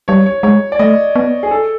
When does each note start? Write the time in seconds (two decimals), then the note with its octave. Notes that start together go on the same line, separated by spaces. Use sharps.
0.08 G3 C#5
0.26 C#5
0.43 G#3 C#5
0.72 D5
0.79 A3 D#5
1.16 B3
1.43 G#4
1.51 A4